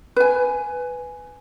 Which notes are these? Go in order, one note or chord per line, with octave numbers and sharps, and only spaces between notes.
B4 G#5